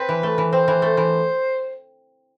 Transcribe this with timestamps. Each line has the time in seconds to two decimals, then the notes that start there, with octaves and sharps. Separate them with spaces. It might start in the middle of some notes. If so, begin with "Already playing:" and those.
Already playing: C4 B4
0.09 E3
0.23 A3
0.38 E3
0.53 C4 C5
0.68 E3
0.82 A3
0.97 E3